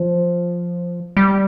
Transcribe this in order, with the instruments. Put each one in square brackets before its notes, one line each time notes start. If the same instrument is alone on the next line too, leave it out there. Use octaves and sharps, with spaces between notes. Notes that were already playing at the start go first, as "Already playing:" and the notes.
Already playing: [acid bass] F3
G3